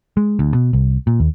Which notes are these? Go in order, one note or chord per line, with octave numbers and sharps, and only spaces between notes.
G#3
D2
B2
C2
A#2
D#2